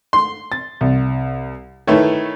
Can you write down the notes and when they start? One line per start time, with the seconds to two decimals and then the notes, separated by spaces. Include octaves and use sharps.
0.13 C6
0.52 A6
0.81 C2
1.87 D#3 A3 E4 B4 C#5